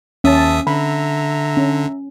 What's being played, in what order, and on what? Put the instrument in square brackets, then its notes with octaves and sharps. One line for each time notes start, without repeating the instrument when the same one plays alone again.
[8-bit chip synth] D#2 E5 D#6 [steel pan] C#4 [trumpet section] A5
[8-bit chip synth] D3 [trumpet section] E5 A#5 [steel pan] B5
[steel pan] C#4